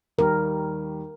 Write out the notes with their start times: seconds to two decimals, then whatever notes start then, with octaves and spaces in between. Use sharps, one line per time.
0.18 D#2 D#3 G3 A#4